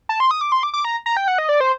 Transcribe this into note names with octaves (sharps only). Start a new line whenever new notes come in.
A5
C6
D#6
D6
C6
D6
D6
A#5
A#5
G5
F#5
D#5
D5
C5